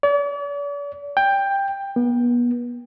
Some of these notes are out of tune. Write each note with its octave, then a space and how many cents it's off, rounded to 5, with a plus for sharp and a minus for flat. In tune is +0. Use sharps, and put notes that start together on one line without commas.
D5 -45
G5 +15
B3 -35